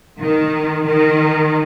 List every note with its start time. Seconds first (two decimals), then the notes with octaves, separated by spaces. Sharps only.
0.20 D#3
0.86 D#3